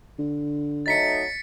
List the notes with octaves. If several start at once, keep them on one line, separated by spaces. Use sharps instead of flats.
D3
F#3 A3 D#4 A6 B6 C#7